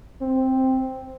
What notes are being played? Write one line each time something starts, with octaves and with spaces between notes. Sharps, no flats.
C4